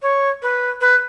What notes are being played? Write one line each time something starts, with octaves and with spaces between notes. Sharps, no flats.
C#5
B4
B4